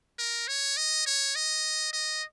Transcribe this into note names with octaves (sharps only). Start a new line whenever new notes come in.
A#4
C#5
D#5
C#5
D#5
D#5